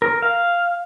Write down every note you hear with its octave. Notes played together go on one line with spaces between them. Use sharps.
A#4
F5